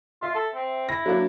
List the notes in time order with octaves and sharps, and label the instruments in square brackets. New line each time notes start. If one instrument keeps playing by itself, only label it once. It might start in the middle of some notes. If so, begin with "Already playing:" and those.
[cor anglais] F4 [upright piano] E5
[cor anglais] A4
C4
[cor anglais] E4 [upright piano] A#6
[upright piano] F#3 A#3 D4